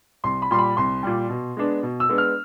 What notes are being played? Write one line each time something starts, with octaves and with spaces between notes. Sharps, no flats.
C2 C6
B5
A#2 G3 C6
B5
C2 C6
A#2 G3
B2
G#3 B3 D4
B2
E6
G#3 B3 D4
F6